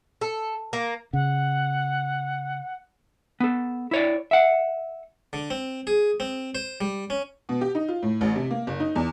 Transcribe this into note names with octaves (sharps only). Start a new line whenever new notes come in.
A4
A#3
C#3 F#5
B3 A4
E4 C#5 D5
E5 F#5
D3
C4
G#4
C4
C5
G3
C#4
B2
G4
D#4
F4
A2
A1
C3
A#3
F#1
D#4
E2